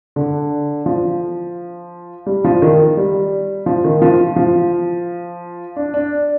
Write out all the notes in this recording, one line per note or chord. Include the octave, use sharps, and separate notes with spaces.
D3
F3
G3
F3
D#3
G3
F3
D#3
F3
F3
D4
D4